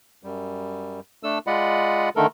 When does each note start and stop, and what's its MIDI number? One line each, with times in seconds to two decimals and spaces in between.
0.23 1.00 42
0.23 1.00 55
1.23 1.39 57
1.23 1.39 62
1.23 1.39 69
1.23 1.39 88
1.47 2.09 56
1.47 2.09 65
1.47 2.09 74
1.47 2.09 75
1.47 2.09 78
1.47 2.09 83
2.16 2.27 50
2.16 2.27 51
2.16 2.27 57
2.16 2.27 69
2.16 2.27 70